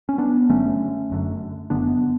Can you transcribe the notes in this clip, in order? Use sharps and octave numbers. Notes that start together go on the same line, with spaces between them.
C#4
B3 D4
F#1 F#2 D3 A3 C#4
F#1 F#2 D3
F#1 F#2 D3 B3 D4